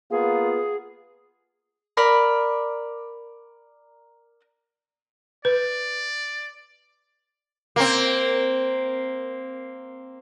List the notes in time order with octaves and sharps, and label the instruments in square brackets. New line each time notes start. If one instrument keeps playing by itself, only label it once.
[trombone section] A#3 B3 F4 [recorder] G#4
[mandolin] A#4 D5 B5
[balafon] B4 [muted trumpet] D5
[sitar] A#3 C4